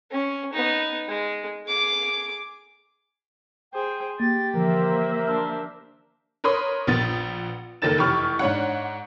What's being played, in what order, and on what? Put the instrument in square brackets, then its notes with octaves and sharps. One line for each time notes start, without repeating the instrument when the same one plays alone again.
[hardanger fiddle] C#4
B3 D#4
G#3
G#4 D6
[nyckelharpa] G#4 C5 [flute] G5
[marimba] A#3 [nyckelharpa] G4 [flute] A6
[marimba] D3 E3 F3 [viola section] A#3 C5 E5 [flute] A#4
[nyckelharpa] D4 [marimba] E6 F6
[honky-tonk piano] A#4 B4 C#5 C6 D#6
A#1 B3 A6
F#1 D#3 A#3 A4 A6 E7
F1 E3 G4 C#6 F6
G#2 D4 C#5 F#5